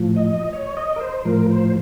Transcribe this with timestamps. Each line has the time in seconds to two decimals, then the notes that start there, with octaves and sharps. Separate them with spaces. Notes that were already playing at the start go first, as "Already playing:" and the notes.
Already playing: A2 F3
0.16 D#5
0.53 C#5
0.77 D#5
0.96 A#4
1.00 C5
1.25 A2 F3 A#4
1.50 C5